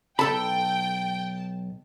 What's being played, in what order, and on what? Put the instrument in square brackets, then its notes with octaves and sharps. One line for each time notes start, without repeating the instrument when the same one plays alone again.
[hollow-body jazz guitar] B1 A4 B5 [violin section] G5 [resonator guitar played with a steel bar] A5